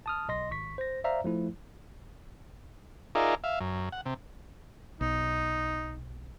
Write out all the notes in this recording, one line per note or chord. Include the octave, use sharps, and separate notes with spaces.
A5 D#6 F6
B1 D#5 C6 A#6
G#1 C#6 B6
C5 A#6
C5 D5 E5 F5 A#5
F3 A3 E4
D#4 F4 G#4 A#4 D5 E5
E5 F5
F#2
F#5
C3
B1 D#4